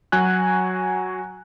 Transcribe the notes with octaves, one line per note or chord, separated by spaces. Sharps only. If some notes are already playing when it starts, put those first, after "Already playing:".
F#3 F#4 G#5 F#6